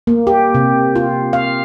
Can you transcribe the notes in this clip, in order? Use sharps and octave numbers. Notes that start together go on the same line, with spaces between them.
A#3
G4
C3
F4
F5